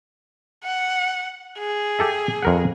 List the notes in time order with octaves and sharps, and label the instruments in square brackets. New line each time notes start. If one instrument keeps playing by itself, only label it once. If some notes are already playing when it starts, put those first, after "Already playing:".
[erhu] F#5
G#4
[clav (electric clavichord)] G4 A4 E5
F2 A#4 F#5